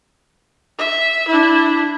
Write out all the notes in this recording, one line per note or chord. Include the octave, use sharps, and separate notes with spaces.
E5
D4 E4